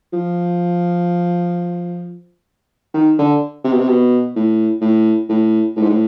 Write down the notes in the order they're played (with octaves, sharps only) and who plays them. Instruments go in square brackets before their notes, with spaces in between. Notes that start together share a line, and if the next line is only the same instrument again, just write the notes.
[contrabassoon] F3
D#3
D3
C3
B2
C3
B2
A2
A2
A2
A2
G#2
A2